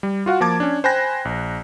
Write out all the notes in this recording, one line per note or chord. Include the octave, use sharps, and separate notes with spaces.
G3
F4 F#4 F5 F#5
F3 A#3 A5 D6 G#6
C#4 D4
C5 G5 G#5 B5 F#6 A#6
A#1